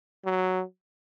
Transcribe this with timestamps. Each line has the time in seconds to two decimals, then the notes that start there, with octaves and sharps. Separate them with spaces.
0.25 F#3